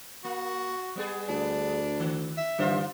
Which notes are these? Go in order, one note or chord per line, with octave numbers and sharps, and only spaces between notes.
A#3 F#4
G3 B3 G#4
D2 D4
D#3
E5
G2 D3 F4 C5